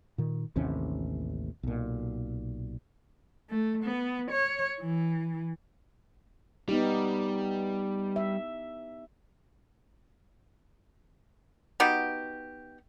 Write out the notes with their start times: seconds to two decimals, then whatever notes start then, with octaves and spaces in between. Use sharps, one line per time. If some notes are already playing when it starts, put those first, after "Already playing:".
0.18 A#2 D#3
0.56 A1 D#2 C3 C#4
1.63 B1 A#2
3.49 A3
3.84 B3
4.31 C#5
4.80 E3
6.69 G3 B3 D#4 G4
8.16 E5
11.80 B3 D#4 F#4 G4